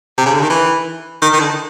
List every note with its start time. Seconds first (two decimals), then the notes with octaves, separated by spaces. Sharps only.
0.18 C3
0.26 C#3
0.34 D3
0.42 D#3
0.50 E3
1.22 D#3
1.33 D#3
1.40 D3